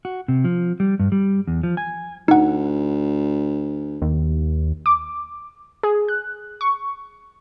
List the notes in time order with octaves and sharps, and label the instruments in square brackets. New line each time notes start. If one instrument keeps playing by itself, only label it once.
[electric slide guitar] F#4
C3
F3
G3
G2
G3
E2
F3
G#5
[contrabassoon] D2 [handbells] D#4 F#5
[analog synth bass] D#2
[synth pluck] D6
G#4
F#6
C#6